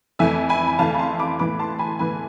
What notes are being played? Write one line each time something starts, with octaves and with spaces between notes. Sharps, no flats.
F2 E3 A3 E5 G#5
G#5 B5
B5
F2 E3 A3 F5 A5
B5
A5 C6
B5 D6
A2 E3 B3 B5 D6
A5 C6
G#5 B5
A2 E3 B3 G#5 B5